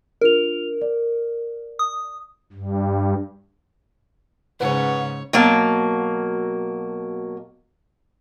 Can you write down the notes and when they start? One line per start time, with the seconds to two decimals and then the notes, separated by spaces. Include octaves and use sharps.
0.21 D4 F4 A#4 F7
0.82 D5
1.79 D#6
2.53 G2
4.60 G#2 C#3 C#4 B4 C#5 F#5
5.33 B2 F#3 A#3 A5